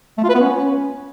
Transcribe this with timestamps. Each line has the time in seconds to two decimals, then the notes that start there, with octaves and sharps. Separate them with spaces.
0.18 A3
0.24 F4
0.29 B4
0.35 B3
0.41 C#4